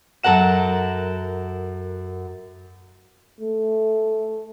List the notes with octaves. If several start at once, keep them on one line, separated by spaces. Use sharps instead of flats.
F#2 A4 A#4 F#5 E7
A3